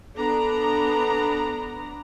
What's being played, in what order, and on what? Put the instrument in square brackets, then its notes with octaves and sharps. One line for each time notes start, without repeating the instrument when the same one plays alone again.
[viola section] B3 D4 A#5 [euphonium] A4